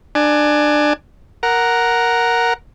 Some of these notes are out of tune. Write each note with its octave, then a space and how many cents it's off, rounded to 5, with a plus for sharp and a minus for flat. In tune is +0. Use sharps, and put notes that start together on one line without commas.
D4 +20 G#5 +20
A#4 +0 F#5 +0